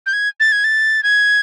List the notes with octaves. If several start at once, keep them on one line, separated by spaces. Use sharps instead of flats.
G6
G#6
A6
G#6
A6
G#6